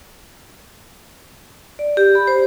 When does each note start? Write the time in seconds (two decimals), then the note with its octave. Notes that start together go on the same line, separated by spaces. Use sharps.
1.79 D5
1.97 G4
2.15 B5
2.27 C5